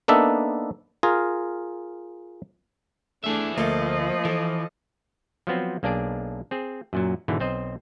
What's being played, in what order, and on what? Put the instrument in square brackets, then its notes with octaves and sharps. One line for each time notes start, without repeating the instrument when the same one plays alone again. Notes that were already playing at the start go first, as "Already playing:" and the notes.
[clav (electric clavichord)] A#3 B3 D4 D#4 A4 E5
F4 G#4 A#4
[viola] A3 D4 [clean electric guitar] E4 G#4 E5
[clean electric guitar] D2 [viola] F3 D#5 [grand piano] A3 A#3 A4
[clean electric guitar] E3 [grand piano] A4
[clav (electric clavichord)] F3 F#3 B3 C4
B1 A#3 D4 G#4 D5
C4 G#4
F#2 A#2 F#3
G#2 B2 D3 E3
B1 C4 C5 D#5